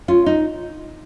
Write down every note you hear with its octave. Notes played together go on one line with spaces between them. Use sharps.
C#4 F4
D#4